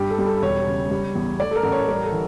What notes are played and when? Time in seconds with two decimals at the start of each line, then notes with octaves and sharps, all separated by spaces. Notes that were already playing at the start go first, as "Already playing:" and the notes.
Already playing: G2 G4
0.10 A4
0.18 G3
0.26 A4
0.42 E1 C#5
0.67 C#3
0.91 G3
1.15 E2
1.40 A3 D5
1.51 A4
1.56 A#4
1.63 A1
1.72 C#5
1.88 G3 A#4
2.04 A4
2.12 E3